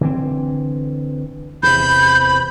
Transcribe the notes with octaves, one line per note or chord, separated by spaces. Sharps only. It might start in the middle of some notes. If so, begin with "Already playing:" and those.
D3 E3 C4
E2 C3 B5 G6